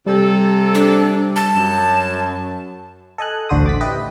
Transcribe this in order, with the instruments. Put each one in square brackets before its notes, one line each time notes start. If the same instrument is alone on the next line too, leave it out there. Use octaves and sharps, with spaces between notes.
[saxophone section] C3 A4 [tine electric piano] G3
[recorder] D4
A5
[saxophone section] F#2
[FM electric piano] A4 D#5 G#5 F#6
A1 D2 D3 F#4 C5 D#6
D6 A6 B6
E4 G4 B4 D#5